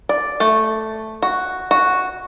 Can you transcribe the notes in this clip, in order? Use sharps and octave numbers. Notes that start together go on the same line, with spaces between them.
D5
A3
F#4
F#4